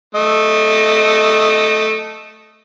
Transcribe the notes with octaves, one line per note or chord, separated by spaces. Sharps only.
A3 D#5